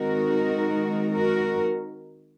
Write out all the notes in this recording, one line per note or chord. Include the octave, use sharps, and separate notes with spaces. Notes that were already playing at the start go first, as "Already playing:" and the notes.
Already playing: D#3 G#3 C4 D#4 F#4 A#4
F#4 A#4